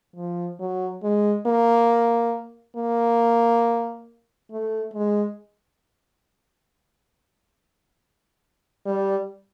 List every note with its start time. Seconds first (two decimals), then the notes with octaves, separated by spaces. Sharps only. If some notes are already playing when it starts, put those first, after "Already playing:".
0.16 F3
0.59 F#3
1.03 G#3
1.46 A#3
2.77 A#3
4.51 A3
4.94 G#3
8.85 G3